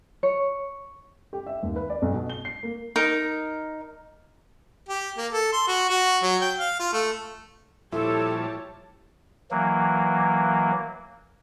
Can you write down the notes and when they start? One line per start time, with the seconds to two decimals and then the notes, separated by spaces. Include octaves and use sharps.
0.23 C#5
1.33 G4
1.46 E5
1.63 D#2
1.76 B4
1.90 D5
2.02 B1
2.14 B2
2.30 G7
2.45 C7
2.63 A#3
2.96 D#4 A#4
4.89 G4
5.18 A#3
5.33 A4
5.53 C6
5.68 F#4
5.90 F#4
6.23 F#3
6.41 G5
6.59 F5
6.80 F4
6.93 A3
7.92 A#2 F3 G3 E4 G4 A4 C#5 A5
9.51 E3 F#3 A#3